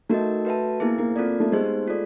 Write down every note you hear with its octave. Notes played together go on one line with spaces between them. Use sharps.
A3 D#4 F#4 A#4 D#5
F#4 B4 E5 A5
A#3 B3 E4 G#4
A#3
C4 F4 A4 D5
A3
G#3 B3 D#4 G4 C5
F4 A4 D5